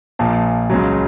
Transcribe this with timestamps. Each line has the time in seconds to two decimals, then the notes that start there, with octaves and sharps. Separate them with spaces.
0.19 A#1 A#2 F3 F5 A5
0.70 C#2 C#3 F#3